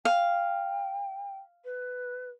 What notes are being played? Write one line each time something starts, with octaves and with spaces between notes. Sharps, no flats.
F5 G5
B4